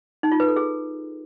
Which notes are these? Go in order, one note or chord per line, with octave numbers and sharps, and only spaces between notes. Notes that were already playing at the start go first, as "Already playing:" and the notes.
D#4
F4
B4
A4
G#4